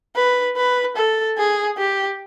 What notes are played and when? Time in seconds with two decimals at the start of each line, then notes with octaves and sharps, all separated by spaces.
0.16 B4
0.56 B4
0.96 A4
1.37 G#4
1.78 G4